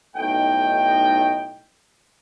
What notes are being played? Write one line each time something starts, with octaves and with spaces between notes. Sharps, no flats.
B1 A2 D#4 D#5 G5